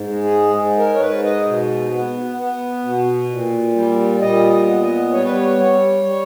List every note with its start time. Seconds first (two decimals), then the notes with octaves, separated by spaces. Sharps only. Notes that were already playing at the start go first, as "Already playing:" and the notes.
Already playing: G#2
0.09 G#3
0.24 G#4
0.54 G#2
0.78 A#4
0.94 C#5
1.00 G#2 B4
1.24 D#5
1.46 B2
1.92 B3
2.37 B3
2.84 B2
3.30 A#2
3.75 G3
4.21 A#2 D#5
4.52 D#5
4.66 B3
4.82 D#5
5.12 G3 C#5
5.24 B4
5.35 C#5
5.59 G3
6.04 G3